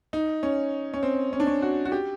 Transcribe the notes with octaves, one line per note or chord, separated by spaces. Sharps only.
D#4
C#4
C#4
C4
C#4
D4
C#4
F#4
F#4
G4